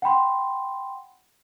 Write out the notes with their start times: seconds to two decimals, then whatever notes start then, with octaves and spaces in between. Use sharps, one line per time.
0.02 F#5 G5 B5 C6